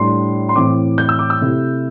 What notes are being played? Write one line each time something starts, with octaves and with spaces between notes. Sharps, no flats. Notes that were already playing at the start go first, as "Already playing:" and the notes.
Already playing: A2 G3 D4 C6
C6
A2 E3 C4 E4 D6
G6
E6
D6
E6
C3 A3 E4